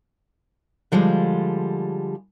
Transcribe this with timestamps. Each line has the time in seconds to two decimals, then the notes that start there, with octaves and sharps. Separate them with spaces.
0.92 D3 F3 G3 G#3